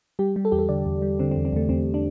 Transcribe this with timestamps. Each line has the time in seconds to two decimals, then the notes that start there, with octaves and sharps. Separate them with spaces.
0.19 G3 G4
0.36 G3
0.45 A4
0.52 E2 G4
0.59 A4
0.69 D3 D5
0.86 E2
1.02 G3
1.19 D3 C4
1.31 C4
1.36 E2
1.45 C4
1.53 E2 A3
1.69 E2 C4
1.94 D4